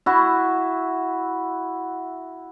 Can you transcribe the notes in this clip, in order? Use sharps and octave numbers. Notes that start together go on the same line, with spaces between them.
E4 F#4